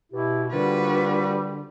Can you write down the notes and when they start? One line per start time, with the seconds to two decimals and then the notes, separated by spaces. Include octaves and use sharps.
0.12 B2 E4 G4
0.52 D3 G3 A#3 C4 F4 F#4 B4